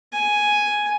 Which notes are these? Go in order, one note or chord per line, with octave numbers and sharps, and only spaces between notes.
G#5